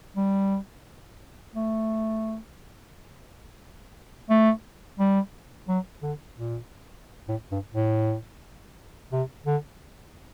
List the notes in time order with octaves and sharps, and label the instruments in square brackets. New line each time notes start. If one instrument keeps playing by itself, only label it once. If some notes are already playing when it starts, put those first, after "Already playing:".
[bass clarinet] G3
A3
A3
G3
F#3
D3
A#2
A2
G2
A2
C3
D3